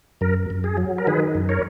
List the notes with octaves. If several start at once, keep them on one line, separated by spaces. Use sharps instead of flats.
F#2 A#4
F#2
G#4
F#3
A#4
D#3 G#4 B4
F#2
A#4 C#5